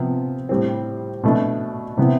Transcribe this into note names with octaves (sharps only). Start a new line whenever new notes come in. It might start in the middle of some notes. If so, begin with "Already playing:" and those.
Already playing: C3 F3 B3
A2 G3 C4
B2 A3 D4
C3 E3 B3 E4